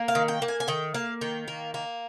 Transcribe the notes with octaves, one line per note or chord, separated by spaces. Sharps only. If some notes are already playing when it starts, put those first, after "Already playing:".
Already playing: A#3
F5
D#3
G5
A#3
G#5
G#5
D#3 G5
A#3 F5
D#3 G5
A#3
A#3